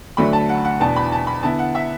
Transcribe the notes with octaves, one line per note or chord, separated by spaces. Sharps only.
D2 D3 F#3 A3 D4 B5
A5
F#5
F#5
E2 B2 B3 D4 A5
B5
A5
B5
D3 B3 E4 A5
F#5
E5